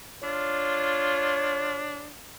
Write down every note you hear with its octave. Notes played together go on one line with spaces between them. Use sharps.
D4 F4 C#5